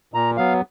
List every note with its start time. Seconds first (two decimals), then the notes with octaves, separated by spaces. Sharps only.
0.14 A#2 A#5
0.37 F#3 B3 F5